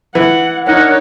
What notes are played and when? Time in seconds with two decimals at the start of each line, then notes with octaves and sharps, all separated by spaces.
0.15 E3 F#5
0.67 D4 D#4 A#4 C#5 F#5